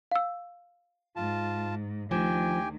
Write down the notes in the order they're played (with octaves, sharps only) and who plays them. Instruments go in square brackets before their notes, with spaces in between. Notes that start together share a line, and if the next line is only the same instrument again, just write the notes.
[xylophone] F5 E6
[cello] G#2 [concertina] F4 A5
[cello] D2 D#3 [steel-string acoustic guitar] F3 [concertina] G4 G5 G#5